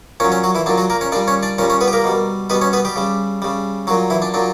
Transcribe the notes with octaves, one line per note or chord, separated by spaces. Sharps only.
A#2 F#3 C#4 C#5
C#4 C#5
F#3 F#4
E3 E4
A#2 F#3 D4
F#3 F#4
A#3 A#4
C#4 C#5
A#2 G3 D4 D5
C#4 C#5
D4 D5
A#2 G3 C#4 C#5
C#4 C#5
B3 B4
G4
A#3 A#4
B2 G3
B2 G3 B3 B4
C#4 C#5
B3 B4
G3 G4
C#3 G3
C#3 G3
A#2 F#3 F#4
E3 E4
D4
A#2 F#3 D4